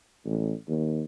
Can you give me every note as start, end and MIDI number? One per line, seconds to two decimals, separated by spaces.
0.25 0.52 33
0.68 1.03 39